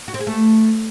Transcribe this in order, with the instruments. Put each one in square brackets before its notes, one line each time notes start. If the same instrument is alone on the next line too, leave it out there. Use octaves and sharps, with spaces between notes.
[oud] F#4
C4
G#4
A3